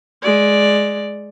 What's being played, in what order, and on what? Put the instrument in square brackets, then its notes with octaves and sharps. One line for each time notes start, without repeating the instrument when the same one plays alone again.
[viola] G#3 D5